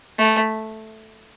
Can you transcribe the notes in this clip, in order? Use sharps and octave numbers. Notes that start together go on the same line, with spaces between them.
A3